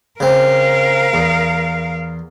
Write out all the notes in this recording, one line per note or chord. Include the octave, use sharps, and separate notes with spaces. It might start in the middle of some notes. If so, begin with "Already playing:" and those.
C#3 C4 A#4 F5
E2